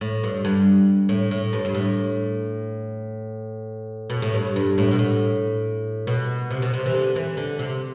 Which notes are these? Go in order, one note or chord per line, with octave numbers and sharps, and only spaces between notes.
A2
G2
G2
A2
A2
G2
G2
A2
B2
A2
G2
G2
A2
B2
A2
B2
C3
B2
C3
E3
D3
E3
D3
C3